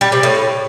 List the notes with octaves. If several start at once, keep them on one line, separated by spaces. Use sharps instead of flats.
G3
C3
A2